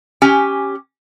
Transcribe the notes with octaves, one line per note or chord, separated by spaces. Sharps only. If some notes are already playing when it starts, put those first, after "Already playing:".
C#4 G4 G#5